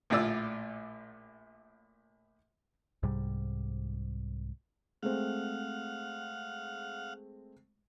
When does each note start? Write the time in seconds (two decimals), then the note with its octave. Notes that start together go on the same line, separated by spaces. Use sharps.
0.10 A#1 A2 F4 D5 E6
3.03 C2 G#2 C3 G3
5.03 G#3 A3 C4 F5 F#5